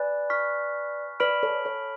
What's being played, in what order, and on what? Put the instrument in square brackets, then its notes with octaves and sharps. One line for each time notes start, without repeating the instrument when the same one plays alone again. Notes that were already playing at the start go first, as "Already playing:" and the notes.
Already playing: [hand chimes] B4 D5 [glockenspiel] G#5 B5 F#6 A6
[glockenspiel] C#6 F6 B6
[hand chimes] B4 D5 [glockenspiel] B5 F6 B6 D7 F#7
[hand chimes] A4 C#5
A4 C#5